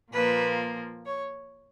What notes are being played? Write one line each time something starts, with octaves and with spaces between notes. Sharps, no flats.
A#2 F3 A#3 B4
C#5